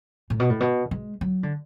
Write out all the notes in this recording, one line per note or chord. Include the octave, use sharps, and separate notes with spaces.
A2
B2
A2
B2
G#3
F#3
D3